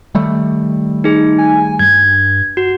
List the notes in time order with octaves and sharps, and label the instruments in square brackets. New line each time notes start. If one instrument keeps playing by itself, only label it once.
[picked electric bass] D#3 G3 A3
[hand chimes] D#4 G#4
[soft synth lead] G#5
[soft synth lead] G2 [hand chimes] G#6
[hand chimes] F#4